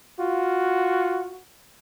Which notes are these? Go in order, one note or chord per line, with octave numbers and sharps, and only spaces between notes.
F4 F#4